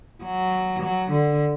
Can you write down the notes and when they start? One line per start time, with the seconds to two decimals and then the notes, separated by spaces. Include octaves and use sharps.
0.23 F#3
0.82 F#3
1.11 D3